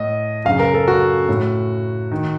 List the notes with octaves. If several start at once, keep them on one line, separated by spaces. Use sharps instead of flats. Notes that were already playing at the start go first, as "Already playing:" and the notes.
Already playing: A2 D#5
F#2 C#3 F5
A#4
A4
F#4
A2
D#3